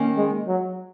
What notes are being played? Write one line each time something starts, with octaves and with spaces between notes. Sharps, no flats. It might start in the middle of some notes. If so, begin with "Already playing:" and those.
Already playing: D#3 A#3 C#4
G#3
F#3